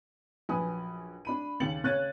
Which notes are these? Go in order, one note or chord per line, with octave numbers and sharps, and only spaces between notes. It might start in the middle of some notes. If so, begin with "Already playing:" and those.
A#1 F#2 B4 G#5 D#6
D4 B5 D#7
D#2 C#3 A6 C#7 F#7
C#3 C#5 F#6 G#6 A6 D#7